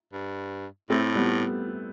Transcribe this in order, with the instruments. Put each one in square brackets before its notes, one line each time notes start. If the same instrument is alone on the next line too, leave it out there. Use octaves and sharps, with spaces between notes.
[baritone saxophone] G2
[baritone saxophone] A2 [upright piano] A3 C4
[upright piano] G3 B3